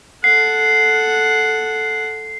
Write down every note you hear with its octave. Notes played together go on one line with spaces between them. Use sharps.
A4 F#5 C7